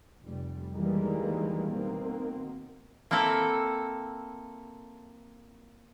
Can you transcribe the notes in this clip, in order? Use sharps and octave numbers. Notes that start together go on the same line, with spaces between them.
F1 G3
D2 D#3 E3 G3 G#3 A#3
B2 D#3 A#3 C4
A#3 C4 E4 A4 A#5